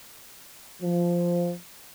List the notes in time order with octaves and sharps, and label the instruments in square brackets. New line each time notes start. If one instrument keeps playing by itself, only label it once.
[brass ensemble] F3